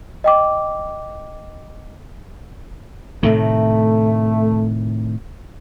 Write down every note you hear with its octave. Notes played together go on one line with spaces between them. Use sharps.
D#5 G5 D6
A2 C3 D#3 A3